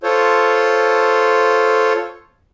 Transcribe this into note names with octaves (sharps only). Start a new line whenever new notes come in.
F4 A4 C5 C#5